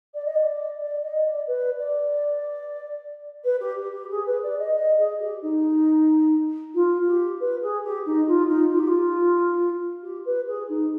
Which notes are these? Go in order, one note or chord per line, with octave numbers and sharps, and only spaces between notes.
D5
D#5
D5
D5
D#5
D5
B4
D5
B4
G4
G4
G#4
B4
D5
D#5
D#5
G#4
G4
D#4
F4
G4
B4
G#4
G4
D#4
F4
D#4
F4
G4
F4
G4
B4
G#4
D#4